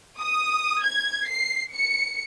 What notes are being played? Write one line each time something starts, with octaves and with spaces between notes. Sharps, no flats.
D#6
G#6
C7
C#7